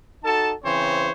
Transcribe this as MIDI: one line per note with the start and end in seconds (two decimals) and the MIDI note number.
0.24 0.54 63
0.24 0.54 66
0.24 0.54 69
0.24 0.54 81
0.64 1.11 49
0.64 1.11 52
0.64 1.11 60
0.64 1.11 72
0.64 1.11 73